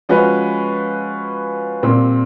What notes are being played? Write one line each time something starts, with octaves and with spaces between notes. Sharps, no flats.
F3 G#3 C#4 F#4 B4
A#2 G3 C4